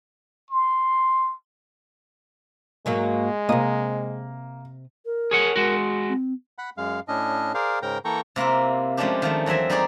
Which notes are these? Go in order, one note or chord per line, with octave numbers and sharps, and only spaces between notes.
C6
G#2 F#3 G#3 A#3
C3 A#3 D#5
A#4
G#4 C#5 F#5
G#3 F#4
C4
F#5 B5
F#2 G#3 F5
A2 C#4 D4 D#5
G#4 A#4 C5 D5 F5
G#2 C#3 A#4 G5 A#5
E3 A#3 A4 G5 A#5 C#6
C3 A#3 E4 F4
F3 G#3 A3 C#4 D4 G4
D#3 F3 A3
E2 F#3 C4 E5 G#5
G3 D#4 G#4 C5 D5